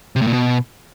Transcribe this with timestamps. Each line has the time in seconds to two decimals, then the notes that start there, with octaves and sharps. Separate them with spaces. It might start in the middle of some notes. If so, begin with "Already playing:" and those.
0.16 C3
0.21 A2
0.27 A#2
0.33 B2